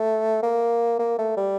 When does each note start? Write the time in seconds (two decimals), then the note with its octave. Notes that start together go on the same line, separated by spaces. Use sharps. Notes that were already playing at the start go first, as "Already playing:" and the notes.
Already playing: A3
0.43 A#3
0.99 A#3
1.19 A3
1.37 G3